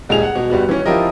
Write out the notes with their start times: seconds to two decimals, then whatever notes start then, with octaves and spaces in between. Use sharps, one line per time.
0.09 D#1 C#2 G3 G#4 F7
0.23 F#5
0.35 B2
0.50 G1 G3 B3 F#4
0.69 E3 C#4
0.86 F3 E4 F4 G4 A#4 D#5